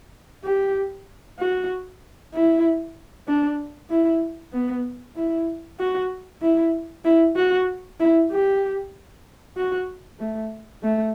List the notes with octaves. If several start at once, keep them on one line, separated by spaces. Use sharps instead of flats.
G4
F#4
E4
D4
E4
B3
E4
F#4
E4
E4
F#4
E4
G4
F#4
A3
A3